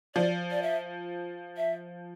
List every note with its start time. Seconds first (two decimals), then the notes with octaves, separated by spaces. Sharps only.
0.15 F3 D5
0.51 D5
0.62 E5
1.57 E5